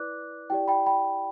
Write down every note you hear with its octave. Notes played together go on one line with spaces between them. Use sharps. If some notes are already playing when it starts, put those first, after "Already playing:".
Already playing: E4 B4 D5 D6 F#6
E4 G4 D5 G5
G5 B5
G5 B5